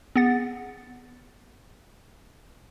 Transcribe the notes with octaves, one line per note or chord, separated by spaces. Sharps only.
B3 G#4 F#5 A6